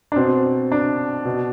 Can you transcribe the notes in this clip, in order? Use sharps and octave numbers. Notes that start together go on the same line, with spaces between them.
D4
B2 C4
D4
B2